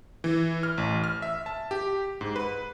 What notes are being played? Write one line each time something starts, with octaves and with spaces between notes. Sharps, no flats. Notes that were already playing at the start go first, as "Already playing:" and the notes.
E3
F6
A1
F6
E5
A5
G4
G#2
B4